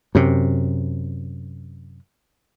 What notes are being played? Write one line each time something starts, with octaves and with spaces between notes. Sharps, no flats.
F#2 C3